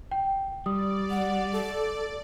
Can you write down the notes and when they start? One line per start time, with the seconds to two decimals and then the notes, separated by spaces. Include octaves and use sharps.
0.11 G5
0.66 G3 D5 D#6
1.10 F#5
1.52 A4